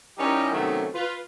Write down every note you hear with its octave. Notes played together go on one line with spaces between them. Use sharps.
G3 C#4 D#4 E4 G4 A#4
C3 D#3 F#3 A3 B3 C#4
F4 B4